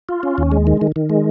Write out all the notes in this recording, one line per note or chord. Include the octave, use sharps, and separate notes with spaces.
F4
C#4
D#2
G#3
D#3
D#3
D#3
G#3